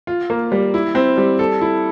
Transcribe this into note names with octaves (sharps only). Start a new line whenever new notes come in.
F4
A#3
G3
E4
C4
G3
A4
E4